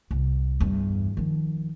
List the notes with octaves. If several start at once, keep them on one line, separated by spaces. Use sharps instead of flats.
C2
E2 G2
D#3 F3